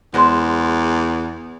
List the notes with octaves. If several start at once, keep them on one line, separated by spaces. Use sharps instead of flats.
E2 G#3 C5